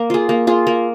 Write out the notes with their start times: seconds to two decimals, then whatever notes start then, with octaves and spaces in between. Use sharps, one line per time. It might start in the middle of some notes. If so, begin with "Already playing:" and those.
Already playing: A#3
0.10 F4 G#4
0.29 A#3
0.47 F4 G#4
0.67 A#3